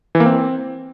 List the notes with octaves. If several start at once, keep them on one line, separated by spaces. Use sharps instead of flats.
E3
A#3
C4